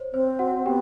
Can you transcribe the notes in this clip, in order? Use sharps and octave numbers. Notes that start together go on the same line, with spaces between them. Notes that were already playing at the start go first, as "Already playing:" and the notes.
Already playing: C5 C#5
C4 C5
F#4 F#5
B3 G4 G5